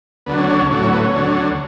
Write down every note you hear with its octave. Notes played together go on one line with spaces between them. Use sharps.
D2 D3 F#3 B3
C#4
C#4
C#4
A2 F#3 D4
C#4
B3
C#4
D2 D3 F#3